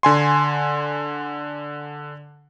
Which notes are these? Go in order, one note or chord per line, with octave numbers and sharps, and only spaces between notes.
D3 G#5 C6